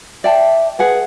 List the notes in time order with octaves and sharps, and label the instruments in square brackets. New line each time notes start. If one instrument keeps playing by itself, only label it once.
[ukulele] D5 G5 A5 [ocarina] E5
[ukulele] G#4 F#5 G#5 [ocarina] B4